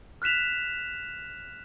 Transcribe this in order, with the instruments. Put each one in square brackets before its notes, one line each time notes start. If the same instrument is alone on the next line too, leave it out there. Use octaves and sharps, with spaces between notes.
[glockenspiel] F6 F#6 B6 E7 F7